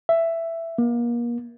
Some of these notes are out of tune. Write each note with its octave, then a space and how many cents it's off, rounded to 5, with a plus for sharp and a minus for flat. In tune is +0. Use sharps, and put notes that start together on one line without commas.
E5 +10
A#3 +35